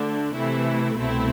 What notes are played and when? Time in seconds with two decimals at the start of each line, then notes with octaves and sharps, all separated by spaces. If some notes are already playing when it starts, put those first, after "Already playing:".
Already playing: D2 D3 A3 D4
0.34 C3 E3 A3 E4
0.97 C2 B2 A3 C4 E4